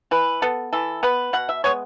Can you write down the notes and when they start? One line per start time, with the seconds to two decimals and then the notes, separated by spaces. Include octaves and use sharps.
0.11 E3 B4
0.42 B3 A4
0.73 E3 A4
1.03 B3 B4
1.33 B2 F#5
1.49 E5
1.64 G#3 B3 C#5